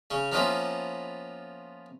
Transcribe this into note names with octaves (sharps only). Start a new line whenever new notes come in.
C#3 C#4
F3 A#3 B3 C#4 E4 F4